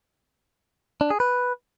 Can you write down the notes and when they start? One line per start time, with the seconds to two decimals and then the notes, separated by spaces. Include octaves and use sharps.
1.01 D4
1.10 G#4
1.20 B4